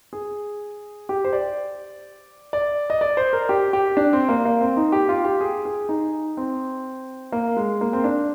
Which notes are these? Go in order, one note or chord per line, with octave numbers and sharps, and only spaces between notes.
G#4
G4
C5
D5
D5
D#5
D5
C5
A#4
G4
G4
D4
C4
A#3
A#3
C4
D#4
G4
F4
G4
G#4
G#4
D#4
C4
A#3
G#3
A#3
C4
D4